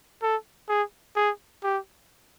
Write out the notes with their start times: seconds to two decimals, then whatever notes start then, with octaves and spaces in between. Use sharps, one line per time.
0.22 A4
0.68 G#4
1.16 G#4
1.63 G4